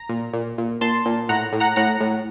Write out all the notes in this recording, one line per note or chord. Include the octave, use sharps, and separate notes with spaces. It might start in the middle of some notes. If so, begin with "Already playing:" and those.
Already playing: A#5
A#2
A#2
A#2
A#2 A5 C6
A#2
A2 F#5 A#5
A2
F#5 A#5
A2 F#5 A#5
A2